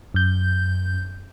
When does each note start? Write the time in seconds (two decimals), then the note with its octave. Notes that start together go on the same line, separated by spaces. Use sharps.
0.14 F#2 G6